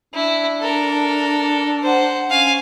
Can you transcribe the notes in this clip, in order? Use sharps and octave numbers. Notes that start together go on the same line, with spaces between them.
D4 E4
A4 A#4
C5 F#5
C#4 F5 G#5